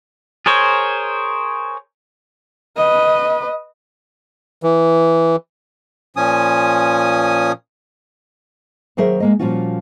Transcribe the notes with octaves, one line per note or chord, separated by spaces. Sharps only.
G#4 A#4 C5 C#5
B4 D#5
E3
A#2 F3 C#4 G#5 D#6
D#2 F#3 G#4 A#4 C5 E5
G#3 A#3 D#5
A#2 F3 G3 C#4 F4 F#4